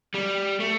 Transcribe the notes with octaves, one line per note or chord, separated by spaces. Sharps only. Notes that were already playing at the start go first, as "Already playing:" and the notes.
G3
A3